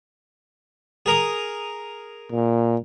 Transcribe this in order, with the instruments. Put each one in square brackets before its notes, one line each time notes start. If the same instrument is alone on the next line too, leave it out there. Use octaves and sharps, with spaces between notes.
[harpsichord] G#4 A#4 D#6
[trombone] A#2